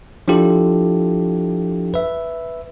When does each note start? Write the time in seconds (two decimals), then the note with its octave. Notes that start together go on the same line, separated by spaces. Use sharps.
0.28 F3 D4 E4 F4 G4 A4
1.94 B4 E5